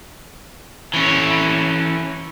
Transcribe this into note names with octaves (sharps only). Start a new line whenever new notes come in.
E3 C#4